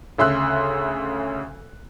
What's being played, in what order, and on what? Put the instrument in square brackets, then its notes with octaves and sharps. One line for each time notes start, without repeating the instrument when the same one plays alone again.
[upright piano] D2 C#3 E5 C6 E6 F#6